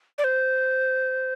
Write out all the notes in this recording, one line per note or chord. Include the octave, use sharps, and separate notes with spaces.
D5
C5